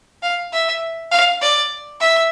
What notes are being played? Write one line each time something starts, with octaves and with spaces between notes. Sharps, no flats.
F5
E5
F5
D5
E5